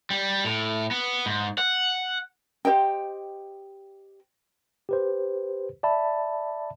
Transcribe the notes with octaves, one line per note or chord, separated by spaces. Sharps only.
G3
A2
B3
G#2
F#5
G4 C5 D#5 G5
G4 B4 C5
D5 E5 A5 B5